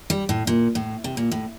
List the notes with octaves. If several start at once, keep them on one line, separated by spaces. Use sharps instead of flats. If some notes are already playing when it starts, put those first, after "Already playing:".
G3
A2
A#2
A2
C3
A#2
A2